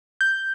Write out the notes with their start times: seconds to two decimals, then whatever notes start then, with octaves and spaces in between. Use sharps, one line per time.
0.21 G6